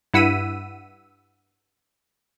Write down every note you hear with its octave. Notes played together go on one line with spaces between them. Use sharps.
G2 E4 F#5 E6 B6 D#7